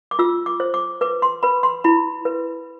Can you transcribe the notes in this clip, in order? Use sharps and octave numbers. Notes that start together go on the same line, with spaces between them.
D6
F4 E6
D6
C5
D6
B4 D6
C6
B4 B5
C6
E4 B5
B4